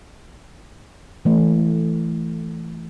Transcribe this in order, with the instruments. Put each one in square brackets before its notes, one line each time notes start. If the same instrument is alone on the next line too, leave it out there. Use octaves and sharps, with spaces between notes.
[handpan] E3 A3